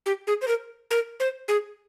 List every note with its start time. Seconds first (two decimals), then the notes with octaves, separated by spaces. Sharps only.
0.06 G4
0.27 G#4
0.42 C5
0.48 A#4
0.91 A#4
1.20 C5
1.48 G#4